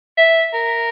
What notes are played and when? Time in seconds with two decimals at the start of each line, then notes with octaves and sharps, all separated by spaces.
0.17 E5
0.54 A#4